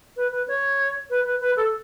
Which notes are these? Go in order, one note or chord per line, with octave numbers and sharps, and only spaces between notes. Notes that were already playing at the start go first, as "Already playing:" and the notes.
B4
B4
C#5
B4
B4
B4
A4